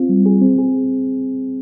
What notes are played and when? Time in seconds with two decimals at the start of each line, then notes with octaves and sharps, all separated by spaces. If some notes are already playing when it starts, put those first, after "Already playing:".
Already playing: C4 F4
0.09 G3
0.26 G#4
0.42 C4
0.58 G#4